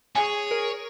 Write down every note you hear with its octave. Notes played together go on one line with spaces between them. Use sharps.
G#4 C#5 G#5
A#4